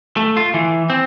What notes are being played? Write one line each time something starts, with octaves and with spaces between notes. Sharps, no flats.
A3
F4
E3
C4